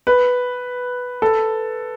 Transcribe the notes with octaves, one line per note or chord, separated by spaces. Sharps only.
B4
A4